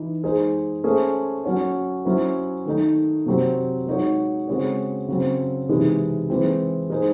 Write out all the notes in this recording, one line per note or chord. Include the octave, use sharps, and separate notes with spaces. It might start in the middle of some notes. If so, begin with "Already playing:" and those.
Already playing: E3 D#4
G#3 D#4 G#4 C5
A3 C#4 G#4 C5
F#3 C#4 F#4 C#5
F#3 C#4 E4 C5
D#3 A3 D#4
C3 F#3 C4
G#3 D#4 F#4 C#5
C#3 G#3 C4 F#4 C#5
C#3 F#3 C4
C3 E3 G#3 D#4
E3 G#3 C4
G#3 D#4 G#4 C5